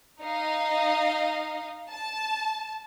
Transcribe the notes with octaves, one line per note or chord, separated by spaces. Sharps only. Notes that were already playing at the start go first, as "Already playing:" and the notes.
D#4 D#5 F5
A5